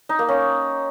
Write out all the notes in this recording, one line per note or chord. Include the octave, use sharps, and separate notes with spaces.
D#4
A#3
C#4